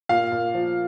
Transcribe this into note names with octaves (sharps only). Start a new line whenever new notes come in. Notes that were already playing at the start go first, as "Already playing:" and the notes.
A#2 F5
A#2
F3